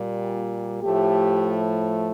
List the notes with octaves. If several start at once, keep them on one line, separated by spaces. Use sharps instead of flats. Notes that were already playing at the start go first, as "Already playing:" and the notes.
Already playing: A#2 G3
A2 F3 A3 G4